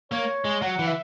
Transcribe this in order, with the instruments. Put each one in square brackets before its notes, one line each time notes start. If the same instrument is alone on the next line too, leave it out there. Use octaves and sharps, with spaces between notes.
[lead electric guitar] A#3 [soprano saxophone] C#5
[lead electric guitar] G#3
[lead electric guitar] F#3 [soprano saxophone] F#5
[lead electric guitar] E3
[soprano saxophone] E5